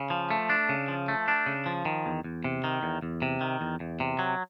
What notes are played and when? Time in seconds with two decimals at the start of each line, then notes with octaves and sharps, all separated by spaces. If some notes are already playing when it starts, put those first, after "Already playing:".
Already playing: C#3
0.10 F3
0.30 A3
0.50 D4
0.69 C#3
0.88 F3
1.08 A3
1.28 D4
1.46 C#3
1.66 F3
1.85 D#3
2.06 E2
2.24 E2
2.44 C3
2.64 D#3
2.83 E2
3.02 E2
3.22 C3
3.41 D#3
3.61 E2
3.80 E2
4.00 C3
4.19 F#3